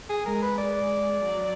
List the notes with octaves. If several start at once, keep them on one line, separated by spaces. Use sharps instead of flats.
G#4
G#3 A#4
B4
G#3 D5
F#3